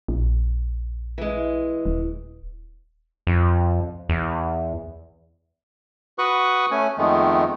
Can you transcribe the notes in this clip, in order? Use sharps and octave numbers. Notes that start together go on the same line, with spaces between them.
A#1
E3 G#3
D#1
F2
E2
F#4 B4 C#6 D#6 F#6
A3 C#4 G#5
F2 D#3 G#3 A3 B3